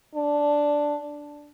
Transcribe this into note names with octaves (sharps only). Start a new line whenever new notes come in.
D4